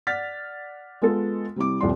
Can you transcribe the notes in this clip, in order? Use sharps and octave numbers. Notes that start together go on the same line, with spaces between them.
D5 F#5 F6 A6 B6
G#3 B3 F4 A4
C3 G3 E4 D6
D#1 C2 F3 D5 C6